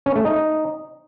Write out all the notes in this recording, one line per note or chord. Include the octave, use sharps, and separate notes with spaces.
C#4
A3
D#4